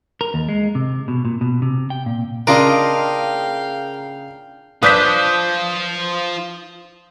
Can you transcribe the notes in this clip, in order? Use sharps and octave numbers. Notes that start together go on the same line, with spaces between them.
A#4
D#2
G#3
C3
B2
A#2
B2
C3
G5
A#2
C#3 D4 F4 A#4 D#5 F5 G5 D7
D4 F4 B4 C5 D#6 G6 B6